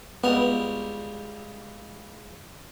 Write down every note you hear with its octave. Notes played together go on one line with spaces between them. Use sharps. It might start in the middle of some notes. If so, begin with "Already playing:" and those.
C#2 G3 B3 A#4